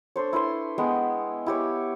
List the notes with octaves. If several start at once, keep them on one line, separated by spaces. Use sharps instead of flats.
D4 A4 C5 C#5
E4 B4 C5 C6
G#3 B3 F#5 G5
E4 G4 C#5